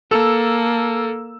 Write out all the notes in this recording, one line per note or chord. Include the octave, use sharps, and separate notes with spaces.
A#3 A4 E6